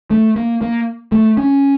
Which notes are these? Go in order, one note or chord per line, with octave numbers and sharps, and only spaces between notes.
A3
A#3
A#3
A3
C#4